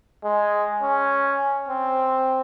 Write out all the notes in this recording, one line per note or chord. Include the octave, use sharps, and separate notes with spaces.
G#3
C#4
C4